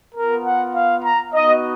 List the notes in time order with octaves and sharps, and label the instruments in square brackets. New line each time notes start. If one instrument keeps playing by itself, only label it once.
[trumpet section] B3 F4 A#4
F#5
F5
A#5
B3 D#4 F#4 D#5